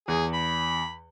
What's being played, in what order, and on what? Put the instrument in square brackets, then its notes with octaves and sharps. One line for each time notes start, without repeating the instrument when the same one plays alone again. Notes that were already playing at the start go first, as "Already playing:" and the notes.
[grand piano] E2 [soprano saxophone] G#4
[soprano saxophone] B5